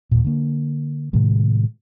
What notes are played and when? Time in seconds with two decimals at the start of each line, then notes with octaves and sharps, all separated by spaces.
0.11 D#2 A#2
0.24 D3 A#3
1.13 A2 C3 D#3 G#3